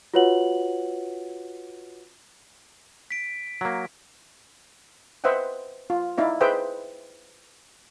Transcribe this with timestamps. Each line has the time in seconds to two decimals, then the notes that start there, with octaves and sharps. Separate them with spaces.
0.14 F4 F#4 B4 C#5 F#5 F#7
3.11 B6 D7
3.61 F#3 A#3
5.24 B4 C5 D#5 E5 F#5 G5
5.90 F4
6.18 D#4 E4 D5 F5
6.41 G#4 B4 C5 D#5 E5 G5